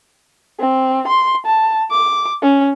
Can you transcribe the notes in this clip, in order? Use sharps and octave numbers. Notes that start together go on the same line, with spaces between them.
C4
C6
A5
D6
C#4